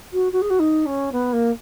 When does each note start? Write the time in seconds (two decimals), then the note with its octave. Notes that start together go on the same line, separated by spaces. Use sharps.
0.13 F#4
0.32 F#4
0.41 G#4
0.50 F#4
0.59 D#4
0.86 C#4
1.12 B3
1.33 A#3